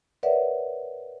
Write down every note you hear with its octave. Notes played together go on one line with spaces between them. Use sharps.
A#4 B4 C#5 D5 E5 F#5